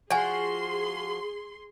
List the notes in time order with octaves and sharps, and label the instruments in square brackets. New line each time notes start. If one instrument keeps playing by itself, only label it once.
[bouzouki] F3 F#4 [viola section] G#4 C6 [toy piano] D5 G#5